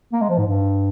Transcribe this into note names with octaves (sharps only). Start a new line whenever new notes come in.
A#3
G#3
F3
G#2
G2